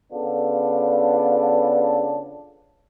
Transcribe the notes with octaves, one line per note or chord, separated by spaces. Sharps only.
C#3 B3 D4 F4 A4